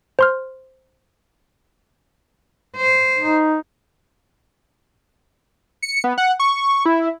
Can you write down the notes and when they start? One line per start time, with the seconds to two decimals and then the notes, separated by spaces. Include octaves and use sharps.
0.19 C5 C6 F6
2.77 C5
3.18 D#4
5.82 C#7
6.04 B3
6.18 F#5
6.40 C#6
6.86 E4